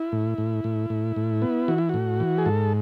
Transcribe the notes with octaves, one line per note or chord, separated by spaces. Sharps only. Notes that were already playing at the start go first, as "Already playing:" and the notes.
Already playing: E4
A2
A2
A2
A2
A2
B3
E3 F#4
E4
A2 F#4
E3
G#4
G#2 A4